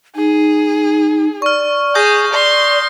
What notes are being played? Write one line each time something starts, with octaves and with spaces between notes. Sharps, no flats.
D#4 G#4
D5 C#6 F6
G#4 D#6 G6 A#6
D5 C6